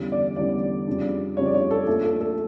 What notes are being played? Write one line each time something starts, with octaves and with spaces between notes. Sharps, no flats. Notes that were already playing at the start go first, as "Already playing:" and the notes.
Already playing: E2 D3 G3 C#4
D5
E2 D3 G3 C#4 D5
F2 C#3 G3 D4
F2 C#3 G3 D4 C#5
D5
C#5
A4
A#1 A#2 A3 A4
A4
A4